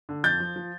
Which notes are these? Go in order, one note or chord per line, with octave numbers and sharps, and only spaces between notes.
D3
F2 G6 A6
F3
F3